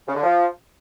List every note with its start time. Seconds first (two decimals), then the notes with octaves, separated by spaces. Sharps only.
0.08 C#3
0.16 D3
0.24 F3